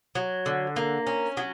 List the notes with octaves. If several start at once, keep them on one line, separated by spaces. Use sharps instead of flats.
F#3
D3
A#3
C#4
F#3